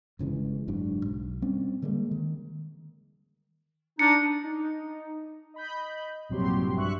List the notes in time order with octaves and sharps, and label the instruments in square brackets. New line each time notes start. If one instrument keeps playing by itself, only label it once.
[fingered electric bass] G1 C#3 E3 G#3
F#1 G#2 F#3 D4
B1
G3 C4 C#4
D3 G3 G#3 A#3
D#3
[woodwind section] D4 D#4 [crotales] C#7
[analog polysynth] D#4
D#5 B5 G6
A#1 G2 C3 F#3 G4 C6
G2 E5 C#6 F#6